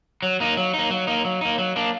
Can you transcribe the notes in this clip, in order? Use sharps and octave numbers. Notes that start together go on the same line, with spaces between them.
F#3
A#3 D#4
F#3
A#3 D#4
F#3
A#3 D#4
F#3
A#3 D#4
F#3
A#3 D4